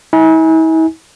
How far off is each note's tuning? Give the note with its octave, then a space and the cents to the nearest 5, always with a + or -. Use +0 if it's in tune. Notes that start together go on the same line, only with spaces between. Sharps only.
E4 -45 G#5 +0